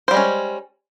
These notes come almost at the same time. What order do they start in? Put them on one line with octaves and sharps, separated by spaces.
C5 G3 G#3 C#4